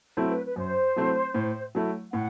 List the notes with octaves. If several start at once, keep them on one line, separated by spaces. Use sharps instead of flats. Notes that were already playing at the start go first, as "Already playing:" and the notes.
F#3 A3 C4 E4
B4
B4
F#2 C5
F#3 A3 C4 E4
A2
F#3 A3 E4
A2 F#5